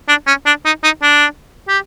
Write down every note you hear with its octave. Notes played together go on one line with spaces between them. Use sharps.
D4
C#4
D4
D#4
D#4
D4
G4